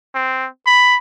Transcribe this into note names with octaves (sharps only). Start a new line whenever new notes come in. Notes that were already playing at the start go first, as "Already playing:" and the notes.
C4
B5